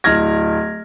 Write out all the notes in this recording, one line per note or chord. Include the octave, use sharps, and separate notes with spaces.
D1 F6 G#6 A#6